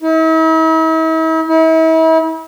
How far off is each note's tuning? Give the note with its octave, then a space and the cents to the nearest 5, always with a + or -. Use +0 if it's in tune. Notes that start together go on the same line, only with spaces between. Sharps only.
E4 -45
E4 -40